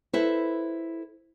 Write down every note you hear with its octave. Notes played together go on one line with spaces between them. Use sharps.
E4 A4 B4 C5 E5